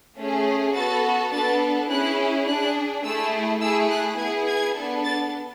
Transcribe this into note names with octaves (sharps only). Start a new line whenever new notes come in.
A3 C#4 G#4
B3 F#4 A4 A6
B3 D4 A4 A6
C#4 E4 G#4 F#6
D4 G#4 F#6
A3 E4 G#4 E6
A3 E4 G#4 E6
F#6
B3 E4 G#4 G#6
G#6
B3 D4 A4
A6